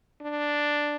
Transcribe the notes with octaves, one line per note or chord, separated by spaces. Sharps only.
D4